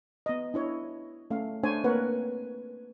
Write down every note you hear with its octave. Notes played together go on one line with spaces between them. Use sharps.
B3 D#5
D4 E4 C#5
A3 C#4 F5
A3 D4 C5 C#5 G#5
A#3 C4 A#4 B4 C#5 F#5